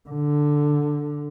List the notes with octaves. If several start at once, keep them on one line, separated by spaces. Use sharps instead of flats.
D3